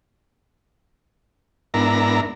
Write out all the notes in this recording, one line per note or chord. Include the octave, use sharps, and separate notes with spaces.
G#2 B3 D4 E4 A#4 A#5